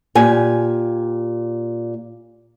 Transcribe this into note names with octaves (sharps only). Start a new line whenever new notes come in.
A#2 G4 G#5